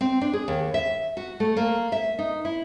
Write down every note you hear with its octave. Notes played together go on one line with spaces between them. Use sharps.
C4
D4
G#4
D#2
E5
F#4
A3
A#3
E5
D#4
E4